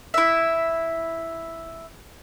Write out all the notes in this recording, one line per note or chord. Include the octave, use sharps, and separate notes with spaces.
E4 E5